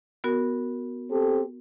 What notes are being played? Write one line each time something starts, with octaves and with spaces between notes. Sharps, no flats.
B3 F#4 A#4
C4 G4 A4